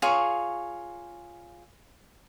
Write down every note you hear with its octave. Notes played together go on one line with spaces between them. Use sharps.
F4 G#4 C#5 C#6